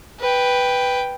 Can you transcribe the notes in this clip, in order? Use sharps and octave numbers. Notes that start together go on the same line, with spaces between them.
B4 G5